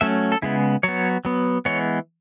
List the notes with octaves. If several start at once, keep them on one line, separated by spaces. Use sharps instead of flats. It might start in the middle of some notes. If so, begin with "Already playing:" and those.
F#3 A3 C#4 E5
A4
C#3 G#3 B3 E4
F#3 B3 C#5
F#3 B3
E3 G#3 B3 C#5